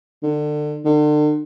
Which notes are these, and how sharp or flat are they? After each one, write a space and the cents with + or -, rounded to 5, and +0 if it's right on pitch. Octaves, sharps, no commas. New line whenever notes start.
D3 +30
D3 +40